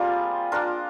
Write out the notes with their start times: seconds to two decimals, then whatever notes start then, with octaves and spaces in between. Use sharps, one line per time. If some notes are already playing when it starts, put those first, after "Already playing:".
Already playing: G3 A#3 C4 F4 G#4
0.52 A#3 D4 F4 A#4